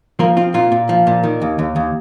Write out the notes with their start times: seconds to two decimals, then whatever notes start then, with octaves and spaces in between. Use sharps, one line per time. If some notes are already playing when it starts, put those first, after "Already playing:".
0.19 F3 A#3 A#4
0.37 C4 F4
0.54 A#2 F4
0.72 A#2
0.89 F3
1.07 A#2
1.24 D#3
1.42 D#2
1.59 D#2
1.76 D#2